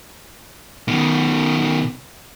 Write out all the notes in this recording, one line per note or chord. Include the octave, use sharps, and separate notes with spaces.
B2 D#3